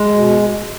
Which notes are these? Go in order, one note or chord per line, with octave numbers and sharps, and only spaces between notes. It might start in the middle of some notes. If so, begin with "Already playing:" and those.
Already playing: G#3
B2